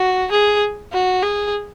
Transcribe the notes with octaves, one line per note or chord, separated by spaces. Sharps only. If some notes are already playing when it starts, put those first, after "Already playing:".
Already playing: F#4
G#4
F#4
G#4